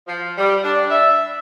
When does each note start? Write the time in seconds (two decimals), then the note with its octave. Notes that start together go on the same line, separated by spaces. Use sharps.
0.07 F3
0.38 G3
0.64 D4
0.90 E5